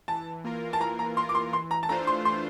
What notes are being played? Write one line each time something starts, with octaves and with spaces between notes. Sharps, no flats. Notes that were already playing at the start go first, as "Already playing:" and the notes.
E3 A5
A#3 F4 A#4
A5
E3 A#5
A#5
A#3 F4 A#4 C6
D6
C6
E3 C6
A#5
A5
A3 D4 F4 C5 A#5
C6
E3 C6